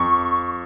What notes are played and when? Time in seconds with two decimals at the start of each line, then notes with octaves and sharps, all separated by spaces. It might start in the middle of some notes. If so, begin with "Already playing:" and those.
Already playing: F2 C#6